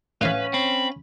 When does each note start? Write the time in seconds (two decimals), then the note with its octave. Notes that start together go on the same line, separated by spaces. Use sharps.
0.21 A2 E3 C#4 B4 F5
0.54 C4 B5